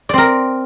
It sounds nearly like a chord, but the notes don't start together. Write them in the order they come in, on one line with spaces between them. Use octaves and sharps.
D5 C4 A#4